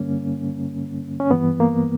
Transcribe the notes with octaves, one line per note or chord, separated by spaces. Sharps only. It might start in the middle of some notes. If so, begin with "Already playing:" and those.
Already playing: G2 D3 G3 A#3 C#4
C#4
G2 E3 G3 B3
A#3